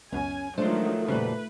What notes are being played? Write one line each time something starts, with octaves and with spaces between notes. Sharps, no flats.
C#2 F#2 B2 C#4 G#5
D#3 F3 F#3 G#3 A3 D4 C5
F2 A#2 C#3 G3 F#4 B4